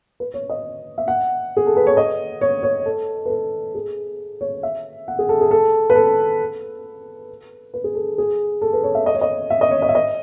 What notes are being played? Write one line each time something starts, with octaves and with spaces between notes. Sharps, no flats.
B4
C#5
D#5
E5
F#5
G#4
A4
B4
C#5
D#5
C#5
C#5
A4
B4
A4
G#4
C#5
E5
F#5
G#4
A4
G#4
A4
B4
A4
B4
G#4
A4
G#4
A4
B4
C#5
E5
D#5
C#5
D#5
E5
D#5
C#5
D#5
E5
D#5